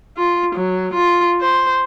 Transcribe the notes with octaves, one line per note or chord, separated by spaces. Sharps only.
F4
F#3
F4
C5